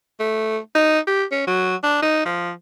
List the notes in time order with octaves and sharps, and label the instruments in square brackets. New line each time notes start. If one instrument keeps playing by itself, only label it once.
[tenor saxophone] A3
D#4
G4
C#4
F#3
D4
D#4
F3